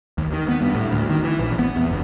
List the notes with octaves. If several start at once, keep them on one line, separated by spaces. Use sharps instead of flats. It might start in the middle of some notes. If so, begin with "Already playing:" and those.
D#2
D#3
B3
G2
A2
D2
D#3
E3
A#1
B3
E2
G1